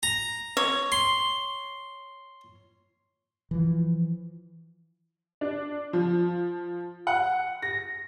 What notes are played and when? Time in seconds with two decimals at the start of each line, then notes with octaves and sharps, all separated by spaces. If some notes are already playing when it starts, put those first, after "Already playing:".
0.03 A#5
0.57 C#5
0.92 C6
3.51 E3 F3
5.41 D4
5.93 F3
7.07 F#5
7.62 A#6